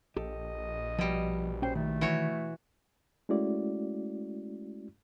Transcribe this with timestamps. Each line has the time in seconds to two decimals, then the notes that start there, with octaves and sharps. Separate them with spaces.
0.17 A#1 G4 A4 D#5
0.98 B2 F3 G3
1.62 C#4 C5 G5
1.75 D#3 A3
2.01 E3 F#4 C#5
3.29 G#3 A3 C#4 E4 F#4 D5